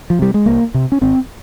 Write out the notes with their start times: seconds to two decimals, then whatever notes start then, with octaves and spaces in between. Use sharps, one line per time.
0.10 F3
0.19 C3 G3
0.34 G#3
0.46 C2 A#3
0.74 C3
0.92 C#4
1.01 G#1 C4